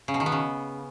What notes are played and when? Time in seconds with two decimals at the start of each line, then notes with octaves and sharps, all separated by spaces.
0.08 C#3
0.14 B2
0.20 D#3
0.26 B3
0.32 C#3